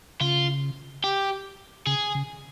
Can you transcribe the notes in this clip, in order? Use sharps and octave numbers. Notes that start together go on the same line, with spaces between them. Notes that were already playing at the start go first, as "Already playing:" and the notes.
C#3 F4
G4
C#3 G#4
C#3